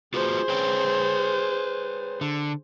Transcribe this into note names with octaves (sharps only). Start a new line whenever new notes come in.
F4 F#4 G#4 B4 C5
B4 C#5 G5
D3